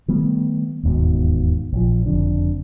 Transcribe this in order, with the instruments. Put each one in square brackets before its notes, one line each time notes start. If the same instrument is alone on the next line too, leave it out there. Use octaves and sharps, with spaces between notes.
[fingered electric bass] D#3 G3 A3 B3
E1 D#2 G#2 B2
A#1 F3
F#1 F2 D3